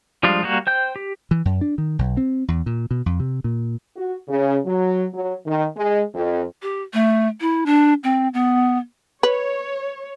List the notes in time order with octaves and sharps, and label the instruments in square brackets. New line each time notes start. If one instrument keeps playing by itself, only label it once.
[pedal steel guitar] F3 G3 G#3 D4 F4
G3 A#3 F#4
C5 G5 G6
G4
[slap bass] E3
F#2
D4
D#3
B1
C4
E2
A#2
B2
F2
C3
A#2
[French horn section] F#4
C#3
F#3
F#3
D#3
G#3
F2
[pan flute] G4
A3
E4
D4
C4
B3
[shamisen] B4 [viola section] C#5